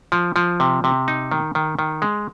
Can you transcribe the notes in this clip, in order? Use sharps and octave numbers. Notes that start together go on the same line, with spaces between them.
F3
F3
C3
C3
D#4
D#3
D#3
D#3
G#3